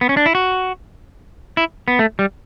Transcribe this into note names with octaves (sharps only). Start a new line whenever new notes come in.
B3
C#4
D4
E4
F#4
E4
B3
A3
G3